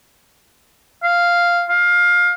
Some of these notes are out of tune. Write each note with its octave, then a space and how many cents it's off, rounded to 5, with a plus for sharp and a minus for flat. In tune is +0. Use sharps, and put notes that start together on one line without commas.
F5 -5
F5 +20